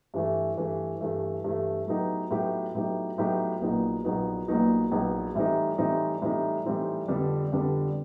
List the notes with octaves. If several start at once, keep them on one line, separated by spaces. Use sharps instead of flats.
G2 E3 A3
G2 E3 A3
G2 E3 A3
G2 E3 A3
A2 F#3 B3 D#4 G4
A2 F#3 B3 D#4 G4
A2 F#3 B3 D#4 G4
A2 F#3 B3 D#4 G4
A#1 A#2 F#3 B3 D#4
A#1 A#2 F#3 B3 D#4
A#1 A#2 F#3 B3 D#4
A#1 A#2 F#3 B3 D#4
A2 E3 G3 C4 D#4
A2 E3 G3 C4 D#4
A2 E3 G3 C4 D#4
A2 E3 G3 C4 D#4
F2 D3 G3 B3 D4
F2 D3 G3 B3 D4